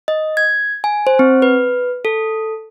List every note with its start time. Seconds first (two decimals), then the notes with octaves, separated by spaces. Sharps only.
0.08 D#5
0.37 G#6
0.84 G#5
1.07 C5
1.19 C4
1.42 B4
2.05 A4